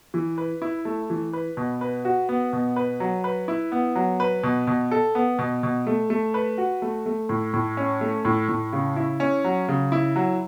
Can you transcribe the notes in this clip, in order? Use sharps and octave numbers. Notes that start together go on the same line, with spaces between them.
E3
B4
E4
A3
E3
B4
B2
B4
F#4
B3
B2
B4
F#3
B4
E4
B3
F#3
B4
B2
B2
A4
B3
B2
B2
A3
A3
B4
F#4
A3
A3
A2
A2
C#4
A3
A2
A2
C#3
E4
C#4
F#3
C#3
E4
F#3